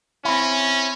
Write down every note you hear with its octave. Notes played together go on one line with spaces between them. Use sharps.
C4 C#4 E4